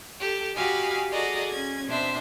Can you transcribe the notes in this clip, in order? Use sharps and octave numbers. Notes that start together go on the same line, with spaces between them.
G4 A4
F#4 G4 D#5 F5 G#5 B5
F#4 G#4 A4 D5 D#5 A#5
C#4 G#6
B2 B3 C4 D4 C5 E5